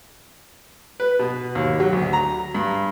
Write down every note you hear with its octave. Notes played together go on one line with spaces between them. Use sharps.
B4
B2
D#2
F#3
D2
A#5
G2